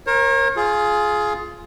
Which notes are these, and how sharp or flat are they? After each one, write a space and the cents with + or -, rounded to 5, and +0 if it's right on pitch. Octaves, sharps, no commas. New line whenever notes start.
A#4 +10 C#5 -40
F4 +0 G#4 +20